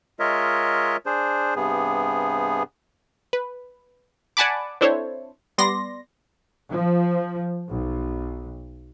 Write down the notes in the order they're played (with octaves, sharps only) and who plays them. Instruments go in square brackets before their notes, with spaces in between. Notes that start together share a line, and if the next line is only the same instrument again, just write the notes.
[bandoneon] G#3 F4 A#4 C#5 D#5 E5
D4 G#4 C5
G2 C3 B3 G#4
[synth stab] B4
D5 F#5 G#5 A5 B5 D6
C4 D4 E4 A4 C5 C#5
G3 B3 D5 C6 A#6
[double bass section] F3
B1